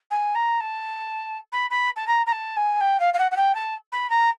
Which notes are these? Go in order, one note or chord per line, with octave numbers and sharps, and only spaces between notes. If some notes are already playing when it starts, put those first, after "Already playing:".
G#5
A#5
A5
B5
B5
A5
A#5
A#5
A5
G#5
G5
F5
F5
F#5
F#5
G5
A5
B5
A#5